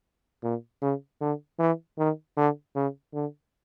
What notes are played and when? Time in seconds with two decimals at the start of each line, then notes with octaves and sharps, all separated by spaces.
0.43 A#2
0.82 C#3
1.21 D3
1.59 E3
1.98 D#3
2.37 D3
2.75 C#3
3.14 D3